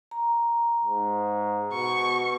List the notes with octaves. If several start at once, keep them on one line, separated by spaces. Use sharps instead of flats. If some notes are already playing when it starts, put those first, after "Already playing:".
A#5
G#2
B2 C#6